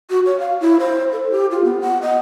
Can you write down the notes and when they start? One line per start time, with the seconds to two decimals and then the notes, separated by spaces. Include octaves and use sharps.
0.10 F#4
0.26 C#5
0.40 F5
0.61 E4
0.80 C5
1.13 A4
1.31 G4
1.51 F4
1.65 B3
1.81 F#5
2.02 D#5